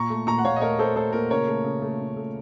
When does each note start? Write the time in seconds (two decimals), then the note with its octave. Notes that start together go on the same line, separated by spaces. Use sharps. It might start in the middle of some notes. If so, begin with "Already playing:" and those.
Already playing: A#2 A#5 C#6
0.10 A3
0.27 A#2 A#5 C#6
0.38 F#5
0.45 A#2 C#5 F5
0.56 D#5
0.61 A3 A#4 C#5
0.79 A3 A4 C5
0.95 A3 A4 C5
1.13 A#2 A#4
1.30 C#3 A#4 C#5
1.47 A3
1.64 C#3
1.82 A3
2.00 C#3
2.17 A3